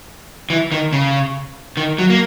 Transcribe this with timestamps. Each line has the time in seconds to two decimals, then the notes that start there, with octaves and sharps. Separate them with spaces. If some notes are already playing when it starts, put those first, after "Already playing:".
0.50 E3
0.72 D#3
0.93 C#3
1.77 D#3
1.98 F#3
2.10 A#3